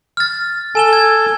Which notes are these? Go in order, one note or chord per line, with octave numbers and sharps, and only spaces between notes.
F6 A6
A4 G#5 E7 G7
G#6